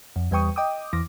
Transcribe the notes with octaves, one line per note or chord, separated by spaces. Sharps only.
F2
E2 G3 B4 G5 C#6 D#6
D#5 G5 D6 D#6
E2 E3 D6 A#6